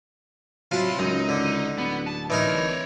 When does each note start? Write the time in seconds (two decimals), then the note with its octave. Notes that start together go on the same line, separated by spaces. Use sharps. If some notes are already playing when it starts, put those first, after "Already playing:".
0.71 C3 F#3 E4 F4 A5
0.99 C#2 F#2 D#4
1.29 D3
1.78 D1 B3
2.07 A5
2.30 E3 D#4 A#4 C#5 D5